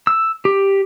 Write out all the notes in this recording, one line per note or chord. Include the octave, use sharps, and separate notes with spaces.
E6
G4